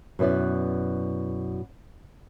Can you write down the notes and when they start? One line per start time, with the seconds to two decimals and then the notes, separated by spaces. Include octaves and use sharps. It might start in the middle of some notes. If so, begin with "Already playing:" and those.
0.19 F#2 B2 B3 E4 D5